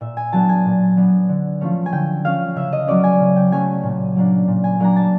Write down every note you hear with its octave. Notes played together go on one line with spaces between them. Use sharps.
A#2 E5
G#5
F#3 B3 D4 A5
G#5
A#2
F#3 B3 D4
D3
F3 A3 C#4
G#5
D3 G5
F3 A3 C#4 F5
C#3 E5
D#5
F#3 A3 C#4 D5
G#5
C#3
G5
F#3 A3 C#4 G#5
A#2
F#3 A#3 D4
A#2
G#5
F#3 A#3 D4 A#5
A5